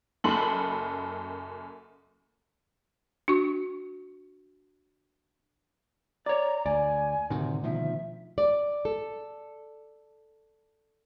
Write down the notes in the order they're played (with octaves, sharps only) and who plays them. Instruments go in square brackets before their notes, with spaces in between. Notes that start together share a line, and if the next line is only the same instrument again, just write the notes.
[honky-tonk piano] F#1 F#2 A4 B5 C6 F#7
[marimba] D4 F#4 C#6
[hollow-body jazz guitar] C#5 D5 [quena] A#5
[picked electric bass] D2 [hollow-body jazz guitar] D5 [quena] G#5
[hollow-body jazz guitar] D2 [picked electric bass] A2 C3 D#3
[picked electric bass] B2 D#3 F3 [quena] E5
[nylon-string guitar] D5
A4